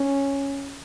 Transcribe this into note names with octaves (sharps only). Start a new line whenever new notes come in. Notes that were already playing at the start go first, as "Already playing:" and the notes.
Already playing: C#4